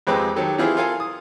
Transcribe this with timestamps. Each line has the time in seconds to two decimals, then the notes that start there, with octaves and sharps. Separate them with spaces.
0.07 F2 G#3 C4 G4 B4 D6
0.36 D#3 F#3 G4 A4
0.58 E3 C4 E4 F4 G4 G#4
0.77 F4 A4 A#4 F5 G#5
1.00 D#6